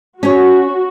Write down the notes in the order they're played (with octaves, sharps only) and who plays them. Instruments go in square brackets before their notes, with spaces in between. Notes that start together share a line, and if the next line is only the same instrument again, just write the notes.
[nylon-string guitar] C#4 C#5 [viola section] F#4